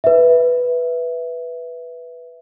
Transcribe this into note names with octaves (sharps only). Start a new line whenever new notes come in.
B4 E5